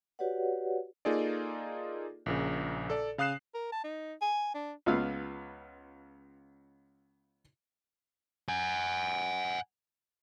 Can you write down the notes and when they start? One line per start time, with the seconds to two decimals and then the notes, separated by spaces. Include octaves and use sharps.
0.19 F#4 G4 B4 C#5 D5 F#5
1.05 A#3 D#4 F4 G#4 A4 D5
2.26 A#1 A#2 C#3
2.90 A4 D5
3.18 C#3 F5 D#6 F#6 C7 E7
3.54 A#4
3.72 A5
3.84 D#4
4.21 G#5
4.55 D4
4.86 C#2 B3 F4 F5 E6
8.49 F#5 G#5